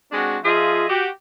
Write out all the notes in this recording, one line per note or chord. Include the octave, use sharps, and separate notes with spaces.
G#3 C4 D4 F#4
F3 F4 G#4 D#5 E5
F#4 G4